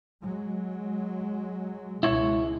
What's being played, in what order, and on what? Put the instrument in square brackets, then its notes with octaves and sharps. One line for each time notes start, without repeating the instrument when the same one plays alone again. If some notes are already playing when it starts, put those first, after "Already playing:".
[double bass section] F#3 G#3
[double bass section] C#2 B2 G#3 [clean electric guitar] E4 C#5